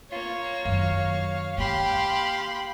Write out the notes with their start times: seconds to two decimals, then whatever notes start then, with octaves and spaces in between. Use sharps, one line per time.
0.12 A#3 F4 C#5
0.65 F#2 D#3 F5
1.58 A#3 G4 B5 C6